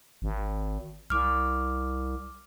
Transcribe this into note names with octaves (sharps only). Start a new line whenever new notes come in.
G#1
C2 D6 F6